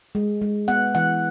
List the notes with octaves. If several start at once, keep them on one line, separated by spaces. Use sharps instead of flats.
G#3
G#3
B3 F#5
E3 F#5